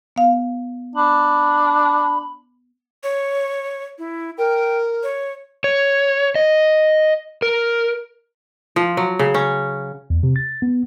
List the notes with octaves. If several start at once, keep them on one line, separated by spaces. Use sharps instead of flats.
B3 F5
D4 B5
C#5
E4
A#4 G5
C#5
C#5
D#5
A#4
F3
F#3
C#3
C#4
E2
C3
A6
B3